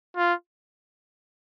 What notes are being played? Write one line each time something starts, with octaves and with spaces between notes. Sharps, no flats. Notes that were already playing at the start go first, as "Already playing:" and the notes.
F4